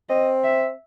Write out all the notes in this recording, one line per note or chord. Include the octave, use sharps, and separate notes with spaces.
C4 D#5
E5